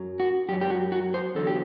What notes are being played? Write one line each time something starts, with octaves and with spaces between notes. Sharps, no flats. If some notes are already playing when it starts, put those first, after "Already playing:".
Already playing: F#2 F#3
F#4
F#2 F#3 G4
G4
F#4
F#4
C5
E2 D3 F#3 A4
G4